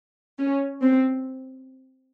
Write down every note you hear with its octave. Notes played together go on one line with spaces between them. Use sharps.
C#4
C4